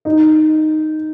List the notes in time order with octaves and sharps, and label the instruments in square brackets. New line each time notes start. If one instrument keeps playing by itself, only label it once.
[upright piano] D#4